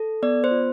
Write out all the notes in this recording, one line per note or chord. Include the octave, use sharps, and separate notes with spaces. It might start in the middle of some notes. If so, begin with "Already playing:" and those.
Already playing: A4
B3 D5
C5
F4